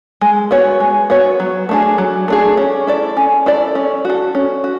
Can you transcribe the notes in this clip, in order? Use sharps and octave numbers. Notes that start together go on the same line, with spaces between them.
G#3
B3 F#4 C#5
G#3
B3 F#4 C#5
F#3
A3 D4 G#4
F#3
A3 D4 G#4
C#4
E4 A4 D5
C#4
E4 A4 D5
C#4
F#4 A4
C#4
F#4